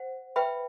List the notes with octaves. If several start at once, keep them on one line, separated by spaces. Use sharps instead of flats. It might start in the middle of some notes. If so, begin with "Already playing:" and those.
Already playing: C5 F#5
B4 E5 G5 B5